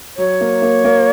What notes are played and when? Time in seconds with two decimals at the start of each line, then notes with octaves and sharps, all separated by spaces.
0.17 F#3 C#5
0.41 A#3
0.62 A#3
0.84 A#3